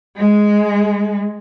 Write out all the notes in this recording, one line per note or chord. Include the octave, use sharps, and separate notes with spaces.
G#3